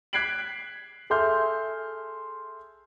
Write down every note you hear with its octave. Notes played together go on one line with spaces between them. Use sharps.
F#6 G#6 B6 C7 D7 F#7
G#4 A4 E5 C6 F6 G6